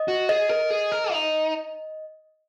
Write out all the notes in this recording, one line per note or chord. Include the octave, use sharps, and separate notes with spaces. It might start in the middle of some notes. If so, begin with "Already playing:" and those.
Already playing: D#5
F#4
G#4 D#5
A#4
G#4
A#4
D#4